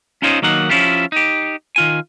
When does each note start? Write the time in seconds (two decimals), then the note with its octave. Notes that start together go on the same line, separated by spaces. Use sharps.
0.22 C#4 D#4 F4 C5 C#5 D#5
0.42 D#3 F#3 A#3 D#4 F#5
0.69 F3 C#4 E4 F4 G4
1.12 D#4 G4
1.76 D#3 F4 G#5